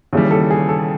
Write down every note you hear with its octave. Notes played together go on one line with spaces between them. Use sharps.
D#2 C#3 E3 G3
A4
G#4
A4